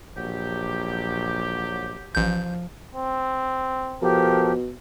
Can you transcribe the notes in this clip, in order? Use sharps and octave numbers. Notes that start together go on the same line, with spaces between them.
A#1 F#3 G4
A1 F3 G6
C4
B2 F3 G4 A4 A#4